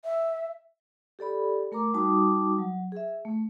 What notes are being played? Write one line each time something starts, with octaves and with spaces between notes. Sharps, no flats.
E5
G4 A4 D5 B5
A3 A#4 A#5 D6
G3 D#4 F#4 A5 D6 D#6
F#3
G#4 E5
A3